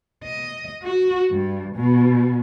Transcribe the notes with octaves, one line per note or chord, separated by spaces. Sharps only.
D#5
F#4
G2
B2